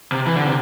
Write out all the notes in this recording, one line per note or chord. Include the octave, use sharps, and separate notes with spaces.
C3
E3
D3
C3